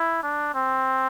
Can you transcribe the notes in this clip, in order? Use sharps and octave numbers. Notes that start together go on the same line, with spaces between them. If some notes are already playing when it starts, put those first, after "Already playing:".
Already playing: E4
D4
C4